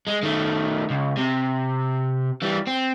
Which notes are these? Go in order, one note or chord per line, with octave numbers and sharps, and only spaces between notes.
G#3
D#3 A3
C#2
C3
E3 G3
C4